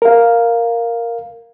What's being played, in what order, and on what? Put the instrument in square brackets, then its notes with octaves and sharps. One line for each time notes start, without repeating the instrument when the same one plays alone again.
[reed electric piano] A#4 F5